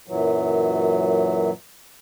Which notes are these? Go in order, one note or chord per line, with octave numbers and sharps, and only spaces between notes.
F#2 A#2 E3 F#3